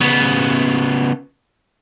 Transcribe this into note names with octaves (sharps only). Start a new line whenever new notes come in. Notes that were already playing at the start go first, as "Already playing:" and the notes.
C#3 B3